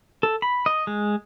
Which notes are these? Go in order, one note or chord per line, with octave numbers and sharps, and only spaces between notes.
A4
B5
D#5
G#3